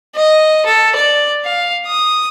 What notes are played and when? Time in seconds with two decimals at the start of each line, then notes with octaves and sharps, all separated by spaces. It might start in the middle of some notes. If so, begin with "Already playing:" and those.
0.15 D#5
0.66 A4
0.96 D5
1.45 F5
1.86 D#6